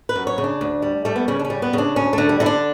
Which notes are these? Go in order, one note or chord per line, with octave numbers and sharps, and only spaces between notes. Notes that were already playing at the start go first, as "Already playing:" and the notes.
B4
F#2
C#5
C#3
D4
D2
G3
G3 A3
B3
C#3 C#4
D4
C#4
G3
B3
C#3 D4
D2 C#4
D3 A3
G3
D3 E4
D4